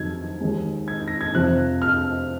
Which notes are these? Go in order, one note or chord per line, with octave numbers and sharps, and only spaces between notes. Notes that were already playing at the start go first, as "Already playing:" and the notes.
Already playing: F2 D#3 F#3 G#6
D#2 D#3 G#3
G#6
A#6
G#6
F2 C3 F3 F#6
F6